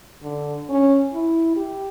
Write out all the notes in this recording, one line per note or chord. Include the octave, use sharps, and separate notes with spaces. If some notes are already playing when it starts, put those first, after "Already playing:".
D3
C#4
E4
G4